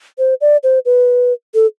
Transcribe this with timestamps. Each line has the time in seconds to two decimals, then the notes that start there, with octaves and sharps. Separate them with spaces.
0.18 C5
0.41 D5
0.63 C5
0.85 B4
1.54 A4